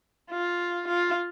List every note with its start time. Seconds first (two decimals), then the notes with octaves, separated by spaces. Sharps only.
0.31 F4
0.88 F4